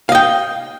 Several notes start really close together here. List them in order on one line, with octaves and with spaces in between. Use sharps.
F5 D#5 G5